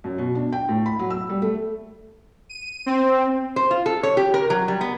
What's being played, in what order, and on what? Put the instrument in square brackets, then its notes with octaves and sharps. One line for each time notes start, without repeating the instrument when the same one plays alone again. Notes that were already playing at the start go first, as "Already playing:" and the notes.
[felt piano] F#2
B2
D4
G5
A2
B5
F#3
E6
G3
A3
[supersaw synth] D#7
C4
[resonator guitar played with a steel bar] C5
F4
A4
C#5
G4
A#4
F#3
G3
B3